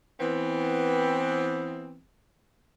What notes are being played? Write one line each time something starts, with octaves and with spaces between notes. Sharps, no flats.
E3 B3 C4